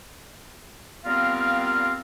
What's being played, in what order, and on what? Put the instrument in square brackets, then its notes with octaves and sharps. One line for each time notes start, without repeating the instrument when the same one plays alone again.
[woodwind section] G3 B3 C4 F4 A#4 F5